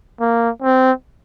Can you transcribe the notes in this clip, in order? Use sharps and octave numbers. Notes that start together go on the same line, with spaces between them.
A#3
C4